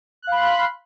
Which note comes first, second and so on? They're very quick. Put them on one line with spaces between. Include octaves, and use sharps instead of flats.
F#6 F5 B5 C6